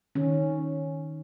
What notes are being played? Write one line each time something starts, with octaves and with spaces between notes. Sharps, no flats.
D#3 C#4